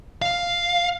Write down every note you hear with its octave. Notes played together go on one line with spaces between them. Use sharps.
F5